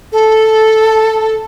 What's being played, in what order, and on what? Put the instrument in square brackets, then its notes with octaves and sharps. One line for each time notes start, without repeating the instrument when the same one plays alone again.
[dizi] A4